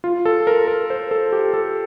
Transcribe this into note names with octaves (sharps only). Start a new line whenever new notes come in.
F4
A4
A#4
A#4
C5
A4
G4
A4